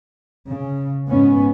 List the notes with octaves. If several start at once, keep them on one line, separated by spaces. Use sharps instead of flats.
C#3
G#2 B3 C#4